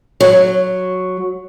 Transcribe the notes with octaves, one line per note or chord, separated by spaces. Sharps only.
F#3